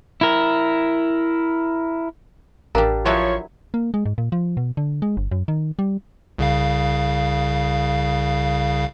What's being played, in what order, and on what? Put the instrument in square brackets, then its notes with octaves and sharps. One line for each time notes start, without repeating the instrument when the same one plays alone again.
[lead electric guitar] E4 A#4
[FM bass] A1 [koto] G3 D4 [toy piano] A#4 F5 A#5
[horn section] F3 C#5 [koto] F#3 E4 B4
[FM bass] A#3
G#3
G#2
A#2
F3
B2
D3
G#3
G1
F#2
D#3
G3
[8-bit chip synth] C2 C#3 F5